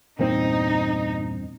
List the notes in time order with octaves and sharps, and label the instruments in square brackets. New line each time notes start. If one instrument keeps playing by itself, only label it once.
[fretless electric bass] E2 G2 C4 [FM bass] A#2 [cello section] D#4